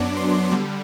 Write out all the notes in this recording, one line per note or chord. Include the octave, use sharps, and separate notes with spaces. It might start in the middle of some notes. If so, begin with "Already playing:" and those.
Already playing: F#2 F#3 B3 D4 D6
C6
D3 G3